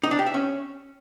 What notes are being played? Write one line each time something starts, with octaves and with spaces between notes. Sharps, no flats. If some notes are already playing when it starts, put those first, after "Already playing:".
D#4
D4
G4
E5
C#4